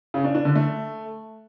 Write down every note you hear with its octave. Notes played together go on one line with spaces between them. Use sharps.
C#3
D4
D4
D3
A3